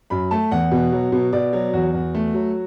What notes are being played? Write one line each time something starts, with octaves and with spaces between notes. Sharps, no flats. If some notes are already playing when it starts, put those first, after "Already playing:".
F#2 B5
A3 A5
E2 F#5
B2
F#3
B2
B2 D5
F#3
E2 F#4
E2
A3
F#3